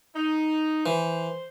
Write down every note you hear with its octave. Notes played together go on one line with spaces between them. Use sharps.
D#4
E3 C5